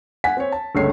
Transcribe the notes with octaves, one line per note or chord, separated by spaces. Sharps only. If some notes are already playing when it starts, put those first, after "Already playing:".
F#5 G#5 B6
C4 C#5
A5
G1 C#2 A3 C#5 C7